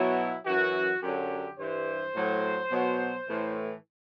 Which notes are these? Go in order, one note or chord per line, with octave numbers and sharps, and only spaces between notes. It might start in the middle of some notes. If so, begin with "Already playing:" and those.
Already playing: B2 F#3 E4
F#2 E3 F#4
F#2 D3 F#3 G4
G2 E3 C5
A2 F#3
B2 F#3
A2 E3